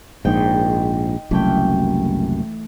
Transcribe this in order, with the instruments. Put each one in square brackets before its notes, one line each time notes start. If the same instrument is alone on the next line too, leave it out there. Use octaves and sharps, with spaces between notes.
[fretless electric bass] A#1 G#2 [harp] D#4 G5
[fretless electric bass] F#1 C2 F#2 [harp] E3 A3 G5